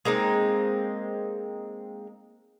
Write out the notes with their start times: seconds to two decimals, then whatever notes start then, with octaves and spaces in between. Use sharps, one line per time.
0.05 G#3 A#3 C4 D#4